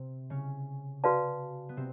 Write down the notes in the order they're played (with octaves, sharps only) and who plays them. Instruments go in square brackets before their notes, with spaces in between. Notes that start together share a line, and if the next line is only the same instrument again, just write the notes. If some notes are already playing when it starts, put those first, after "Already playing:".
Already playing: [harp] C3 C4
C#3 C#4
[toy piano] F#4 B4 D5 F5 A5
[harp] B3
C3 C4